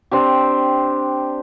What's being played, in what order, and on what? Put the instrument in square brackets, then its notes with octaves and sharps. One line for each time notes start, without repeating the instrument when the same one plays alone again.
[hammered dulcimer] C4 D4 G4